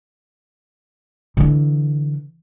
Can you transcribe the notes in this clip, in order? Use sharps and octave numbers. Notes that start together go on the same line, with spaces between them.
D3 E3